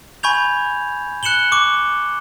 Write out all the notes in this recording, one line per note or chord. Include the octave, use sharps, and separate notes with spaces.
G#5 B5 C#6 G6 G#6 F7
F#6 C#7 E7 F#7 G7
C#6 D6